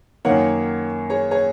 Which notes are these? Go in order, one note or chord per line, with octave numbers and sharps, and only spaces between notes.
F#2 D#3 A#3 C#5 F#5
G#4 C#5
G#4 C#5